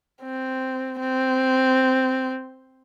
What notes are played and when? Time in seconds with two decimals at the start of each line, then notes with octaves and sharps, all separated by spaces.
0.23 C4
0.99 C4